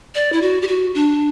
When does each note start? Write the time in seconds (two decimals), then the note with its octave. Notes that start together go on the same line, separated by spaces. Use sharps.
0.15 D5
0.33 E4
0.42 F#4
0.62 G4
0.68 F#4
0.95 D4